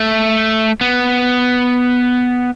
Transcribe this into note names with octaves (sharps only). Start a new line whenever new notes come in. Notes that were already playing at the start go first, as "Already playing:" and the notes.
Already playing: A3
B3